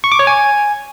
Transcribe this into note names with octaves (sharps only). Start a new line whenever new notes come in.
C#6
D6
C#5
G#5